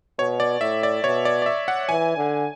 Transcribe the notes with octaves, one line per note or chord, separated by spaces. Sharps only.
B2 C#5
D5
A2 E5
D5
B2 C#5
D5
D5
E5
F#5
E3 G#5
D3